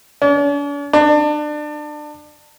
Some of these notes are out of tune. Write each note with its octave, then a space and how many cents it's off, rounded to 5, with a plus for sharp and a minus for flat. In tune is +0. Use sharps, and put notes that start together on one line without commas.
D4 -45
D4 +30